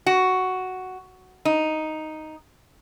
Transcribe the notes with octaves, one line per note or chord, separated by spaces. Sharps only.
F#4
D#4